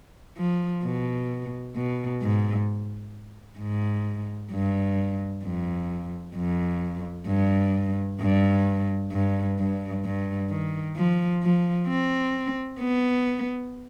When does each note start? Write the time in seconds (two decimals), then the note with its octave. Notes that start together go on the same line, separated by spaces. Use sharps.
0.37 F3
0.83 B2
1.76 B2
2.21 G#2
3.59 G#2
4.52 G2
5.44 F2
6.36 F2
7.28 G2
8.20 G2
9.12 G2
9.59 G2
10.04 G2
10.50 D#3
10.96 F3
11.43 F3
11.88 C4
12.80 B3